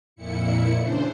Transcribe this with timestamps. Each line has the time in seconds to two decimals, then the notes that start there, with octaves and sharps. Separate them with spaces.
0.16 F2 A#2 E4 C#7
0.78 C#3 E3 D4 C5